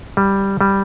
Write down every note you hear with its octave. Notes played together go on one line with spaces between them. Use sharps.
G3
G3